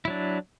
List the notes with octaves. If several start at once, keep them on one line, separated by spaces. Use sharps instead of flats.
F#3 D4 E4